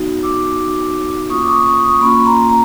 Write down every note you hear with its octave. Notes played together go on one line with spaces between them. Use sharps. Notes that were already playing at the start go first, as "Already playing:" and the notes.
Already playing: B3 D#4 F#4
D6 E6
B3 D#4 F#4
A#3 C#4 F4 C#6 D#6
D6
C#6 D#6
C#6 D#6
C#6 D#6
A#3 C#4 F4 B5 C#6
B5
A#5 C6
A#5